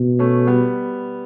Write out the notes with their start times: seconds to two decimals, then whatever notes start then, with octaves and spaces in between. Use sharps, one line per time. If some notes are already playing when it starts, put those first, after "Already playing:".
Already playing: B2
0.19 A3 C#4
0.47 G3 B3